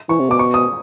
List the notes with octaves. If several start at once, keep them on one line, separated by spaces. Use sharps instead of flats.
E3 C#6
C3
B2 D6
C#6
D#6